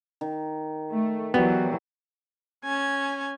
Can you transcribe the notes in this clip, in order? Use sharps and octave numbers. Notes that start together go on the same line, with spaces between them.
D#3
A3
E3 F#3 B3 F#4 G4 D5
C#4 G#5